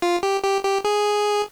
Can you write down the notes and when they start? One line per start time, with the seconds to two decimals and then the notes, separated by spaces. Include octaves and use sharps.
0.02 F4
0.23 G4
0.43 G4
0.64 G4
0.84 G#4